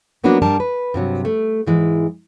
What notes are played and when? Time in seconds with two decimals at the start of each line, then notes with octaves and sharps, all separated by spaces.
0.24 F#3 A#3 B3 C#4 D4 F#4
0.42 G2 G3 D4 A#4 A5
0.60 B4
0.94 G2 C3 F#3
1.25 A3
1.67 G#2 E3 G#3